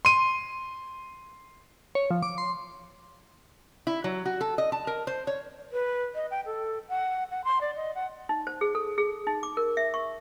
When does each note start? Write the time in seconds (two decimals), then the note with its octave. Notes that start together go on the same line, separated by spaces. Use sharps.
0.05 C6 D#7
1.95 C#5
2.11 F3
2.23 D6
2.38 C6
3.87 E4
4.04 F#3
4.25 F#4
4.41 A4
4.58 D#5
4.72 A5
4.87 A#4
5.07 C5
5.27 C#5
5.73 B4
6.15 D#5
6.31 G5
6.46 A4
6.89 F#5
7.31 F#5
7.44 C6
7.61 D5
7.76 D#5
7.95 F#5
8.29 D#4
8.47 C5
8.61 G#4
8.75 A4
8.98 G#4
9.27 D#4
9.43 D6
9.57 A#4
9.77 E5
9.94 C#6